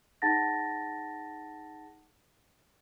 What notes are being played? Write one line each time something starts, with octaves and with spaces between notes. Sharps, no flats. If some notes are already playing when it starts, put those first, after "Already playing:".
D#4 G#4 F#5 A5 A6 A#6